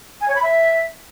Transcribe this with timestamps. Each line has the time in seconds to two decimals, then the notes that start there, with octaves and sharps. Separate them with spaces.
0.21 G#5
0.28 C#5
0.35 B5
0.43 E5